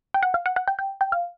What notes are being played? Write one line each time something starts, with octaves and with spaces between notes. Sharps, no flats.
G5
F#5
F5
F#5
F#5
G5
G5
G5
F5